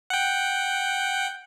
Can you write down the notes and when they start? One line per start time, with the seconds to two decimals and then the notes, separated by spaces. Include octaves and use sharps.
0.10 F#5 G5